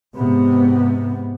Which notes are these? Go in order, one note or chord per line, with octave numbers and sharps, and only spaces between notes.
G#2 C3 B3